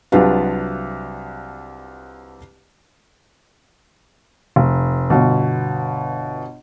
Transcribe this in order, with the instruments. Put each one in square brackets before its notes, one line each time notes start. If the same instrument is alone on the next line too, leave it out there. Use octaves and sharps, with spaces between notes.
[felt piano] C2 F#3 D4 F4 B4 F5
[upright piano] F1
G1 B2